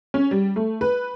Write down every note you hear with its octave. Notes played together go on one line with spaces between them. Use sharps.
C#4
G3
A3
B4